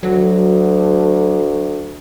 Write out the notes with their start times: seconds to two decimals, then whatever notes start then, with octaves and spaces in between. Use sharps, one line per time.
0.03 D2 F#3